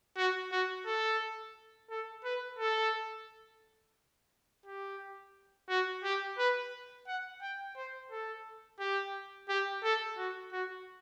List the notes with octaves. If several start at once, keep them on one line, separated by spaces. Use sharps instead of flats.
F#4
F#4
A4
A4
B4
A4
G4
F#4
G4
B4
F#5
G5
C5
A4
G4
G4
A4
F#4
F#4